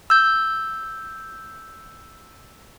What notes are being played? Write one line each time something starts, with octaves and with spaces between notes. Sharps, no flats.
E6 G6